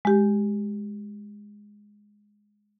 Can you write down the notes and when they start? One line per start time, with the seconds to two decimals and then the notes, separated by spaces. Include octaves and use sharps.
0.05 G#3 G4